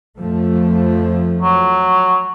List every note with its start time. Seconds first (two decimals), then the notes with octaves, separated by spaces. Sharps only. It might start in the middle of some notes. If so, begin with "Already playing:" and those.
0.17 F2 F3 A3
1.41 F#3